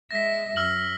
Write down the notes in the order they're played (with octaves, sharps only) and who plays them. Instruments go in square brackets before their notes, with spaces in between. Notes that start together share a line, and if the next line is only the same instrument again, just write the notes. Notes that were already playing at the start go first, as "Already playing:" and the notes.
[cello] G#3 E5 [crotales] A#6 B6
[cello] F#2 [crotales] E6 F6 F#7